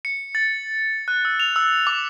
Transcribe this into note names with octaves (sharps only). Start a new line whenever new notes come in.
C#7
A6
F#6
E6
F7
E6
D6